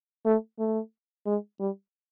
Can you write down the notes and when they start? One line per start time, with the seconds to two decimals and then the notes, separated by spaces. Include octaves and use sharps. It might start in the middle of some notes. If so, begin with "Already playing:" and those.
0.25 A3
0.59 A3
1.26 G#3
1.59 G3